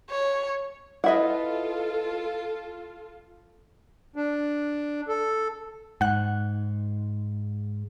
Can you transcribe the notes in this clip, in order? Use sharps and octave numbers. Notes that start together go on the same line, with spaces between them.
C#5
E4 F4 A4 B4 D#5 E5 F#5
D4
A4
G#2 F#5 F#6